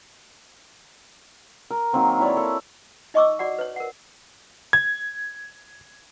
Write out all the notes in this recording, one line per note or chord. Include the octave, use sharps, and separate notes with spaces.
A#4
D#3 F#3 A#3 C4
E4 C#5 D5
A4
D#4 D#5 G#5 C#6 D6 E6
F#4 D5 F#5
B4 C#5
A#4 F#5
G#6